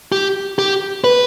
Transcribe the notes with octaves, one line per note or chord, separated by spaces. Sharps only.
G4
G4
B4